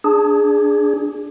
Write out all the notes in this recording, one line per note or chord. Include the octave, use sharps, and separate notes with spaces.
D4 G#4